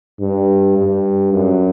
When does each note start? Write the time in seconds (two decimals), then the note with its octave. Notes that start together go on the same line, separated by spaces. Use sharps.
0.19 G2
0.77 G2
1.33 F#2